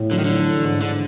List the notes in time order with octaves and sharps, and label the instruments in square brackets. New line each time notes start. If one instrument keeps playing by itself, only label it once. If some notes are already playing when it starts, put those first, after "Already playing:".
Already playing: [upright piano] A2 E4
[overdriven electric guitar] D3 [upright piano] F#3
[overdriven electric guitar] D#3
[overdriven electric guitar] D3 [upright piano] E4
[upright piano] E3
G#2
[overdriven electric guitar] D3 [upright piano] G#3